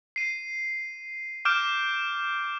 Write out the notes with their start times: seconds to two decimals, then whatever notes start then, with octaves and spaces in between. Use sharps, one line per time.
0.16 C7 D#7
1.45 D6 F6 G6 D7 E7